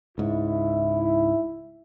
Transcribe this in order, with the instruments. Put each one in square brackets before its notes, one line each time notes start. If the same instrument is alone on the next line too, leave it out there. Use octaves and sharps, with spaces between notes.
[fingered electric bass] C#2 G#2 [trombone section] E4